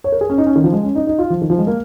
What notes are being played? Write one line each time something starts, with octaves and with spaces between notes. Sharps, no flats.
C#5
A#4
G#4
C#4
D#4
C#4
D#3
F3
G#3
C#4
D#4
D#4
F4
F3
D#3
F3
G#3
A#3